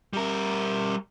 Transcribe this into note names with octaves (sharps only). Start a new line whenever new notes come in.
G3 A#4